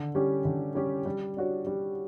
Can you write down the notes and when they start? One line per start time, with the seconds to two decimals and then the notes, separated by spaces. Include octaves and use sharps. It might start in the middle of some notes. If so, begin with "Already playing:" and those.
Already playing: D3
0.15 G3 C#4 G4
0.45 D3
0.75 G3 C#4 G4
1.06 G3
1.37 D4 F#4 C#5
1.67 G3